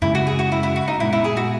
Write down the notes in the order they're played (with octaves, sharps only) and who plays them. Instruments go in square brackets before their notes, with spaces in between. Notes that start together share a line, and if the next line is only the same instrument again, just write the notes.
[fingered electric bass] F#2 C#3 G#3 C#4 [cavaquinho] E4
[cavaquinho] F#4
G#4
F#4
E4
E4
F#4
D#4
[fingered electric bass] A#2 G#3 B3 [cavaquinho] E4
[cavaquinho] E4
G#4
F#4